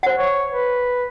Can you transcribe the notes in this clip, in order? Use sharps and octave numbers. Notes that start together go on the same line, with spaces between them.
C5 F#5
C#5
B4